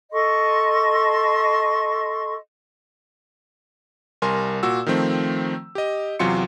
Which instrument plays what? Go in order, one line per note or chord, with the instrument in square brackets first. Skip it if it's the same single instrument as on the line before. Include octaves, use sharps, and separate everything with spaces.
[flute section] A4 D#5 C6 C#6
[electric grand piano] C2 G3 A#4 G#5 C6
A#2 F#4 E6
D#3 F3 A3 C4
G4 D#5
E2 C3 F#3 F4 C6 C#7